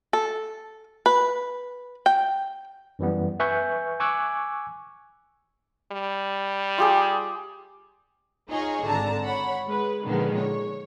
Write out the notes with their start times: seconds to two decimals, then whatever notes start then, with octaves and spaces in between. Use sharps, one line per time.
0.13 A4
1.06 B4
2.06 G5
2.99 F#2 E3 G3 B3
3.40 B4 E5 G#5 C#6 F#6 G6
4.00 G#5 C#6 D6 E6 F#6 G#6
5.92 G3
6.78 F4 G4 G#4
8.49 D#4 F4 G#4 C#5 D#5
8.85 G#1 D3 A5 A#5
9.24 C#5 F#5 B5
9.67 G#3 B4
10.04 A#2 D3 D#3 F3 G#3 B3
10.36 C#5